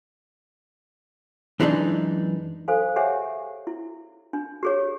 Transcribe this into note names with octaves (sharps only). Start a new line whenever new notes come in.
F#2 E3 G#3 A#3 D4 D#4
A4 C5 F5 G#5
G4 G#4 C#5 E5 F#5 G#5
E4
D4
G4 G#4 C#5